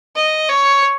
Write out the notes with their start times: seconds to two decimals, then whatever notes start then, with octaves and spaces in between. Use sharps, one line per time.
0.16 D#5
0.49 C#5